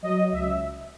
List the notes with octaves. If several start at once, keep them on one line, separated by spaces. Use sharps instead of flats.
F#3 D#5
C#2 E5